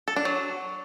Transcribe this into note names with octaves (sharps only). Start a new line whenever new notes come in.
A4
D4
F#3